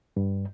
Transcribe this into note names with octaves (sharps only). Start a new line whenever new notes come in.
G2